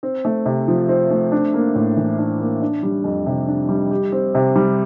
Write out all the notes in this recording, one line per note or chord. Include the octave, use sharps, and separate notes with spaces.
C4
A3
C3
F3
C4
A3
D4
A#3
A2
E3
D4
A#3
D4
G3
F2
C3
D4
G3
G4
C4
C3
G3